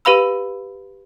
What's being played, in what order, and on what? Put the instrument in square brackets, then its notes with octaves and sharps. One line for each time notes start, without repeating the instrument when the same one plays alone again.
[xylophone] G4 B4 F5 B5 E6